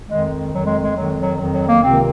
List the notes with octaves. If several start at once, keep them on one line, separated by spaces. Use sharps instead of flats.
F2 D#3 G#3
F2 D#3 F#3
G#3
G#3
F2 D#3 F#3
F#3
F2 D#3
F#3
A#3
C#2 C3 D#3 C4